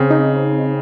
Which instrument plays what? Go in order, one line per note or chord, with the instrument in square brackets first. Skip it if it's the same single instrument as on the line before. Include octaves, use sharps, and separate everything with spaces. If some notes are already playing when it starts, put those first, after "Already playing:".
Already playing: [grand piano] C#3 [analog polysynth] C4
[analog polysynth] D#4